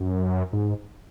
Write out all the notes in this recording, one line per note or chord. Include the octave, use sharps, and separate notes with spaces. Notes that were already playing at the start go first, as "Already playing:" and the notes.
Already playing: F#2
G#2